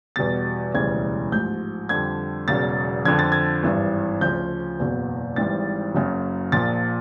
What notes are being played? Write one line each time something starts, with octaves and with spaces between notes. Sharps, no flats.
E2 B2 G3 A6
E1 D2 C#3 E3 G3 G#6
A1 G#2 F3 G6
F2 D3 G3 G#6
E1 E2 C#3 F#3 A6
F2 D3 F3 G#6
A6
G#6
G#1 G2 E3
D2 C#3 F3 G6
F#1 E2 B2 F#3
G#1 G#2 E3 G3 A6
F#1 F#2 C#3 F#3
A#1 A#2 F3 A6